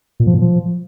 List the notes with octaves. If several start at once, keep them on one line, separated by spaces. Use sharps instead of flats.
A#2
F3
A#2
F3